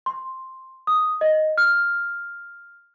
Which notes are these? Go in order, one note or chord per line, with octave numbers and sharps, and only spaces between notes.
C6
D#6
D#5
F6